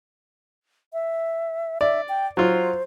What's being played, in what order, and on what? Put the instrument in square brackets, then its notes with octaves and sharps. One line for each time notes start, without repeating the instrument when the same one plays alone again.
[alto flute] E5
[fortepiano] D5 [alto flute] E5
[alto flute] G5
[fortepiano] F#3 F4 [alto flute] C5